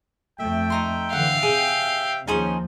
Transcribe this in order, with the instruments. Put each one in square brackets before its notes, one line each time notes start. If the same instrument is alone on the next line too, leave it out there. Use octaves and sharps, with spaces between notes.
[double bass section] F2 A3 [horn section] E5 G5
[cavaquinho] D#4 A#5 C6
[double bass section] D3 E3 [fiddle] F5 [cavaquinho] F#5
[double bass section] C3 [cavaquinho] G#4
[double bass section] D#2 F3 [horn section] C#4 [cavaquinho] D#4 G#4 C5